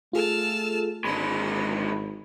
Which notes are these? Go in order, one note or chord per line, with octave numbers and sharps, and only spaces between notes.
A3 F4 G#4 A4 A5 E6 F6
G#1 D3 G#3 D#4 B5